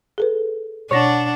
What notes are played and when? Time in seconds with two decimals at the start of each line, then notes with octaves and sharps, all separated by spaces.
0.18 G#4 A4 B4
0.91 B2 D4 C#5 F#5 A5 A#6